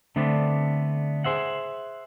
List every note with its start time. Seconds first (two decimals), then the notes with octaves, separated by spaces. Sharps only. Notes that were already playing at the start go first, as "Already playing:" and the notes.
0.16 D3 A3 B3 C4 D4
1.24 G#4 C5 E5 F#5